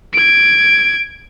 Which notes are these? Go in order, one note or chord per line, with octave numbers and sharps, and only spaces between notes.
G#6 D7